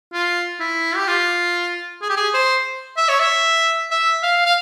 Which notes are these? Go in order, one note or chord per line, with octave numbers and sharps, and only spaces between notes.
F4
E4
G4
F4
G#4
G4
G#4
C5
E5
C#5
E5
E5
F5
F5